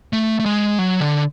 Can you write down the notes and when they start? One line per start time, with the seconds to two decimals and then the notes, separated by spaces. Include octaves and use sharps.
0.13 A3
0.40 A3
0.46 G#3
0.79 F#3
1.01 D3